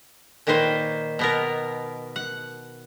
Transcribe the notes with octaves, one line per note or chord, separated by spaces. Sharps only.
A#2 D#3 A#3 B4 C5
B2 B3 A#4
F#5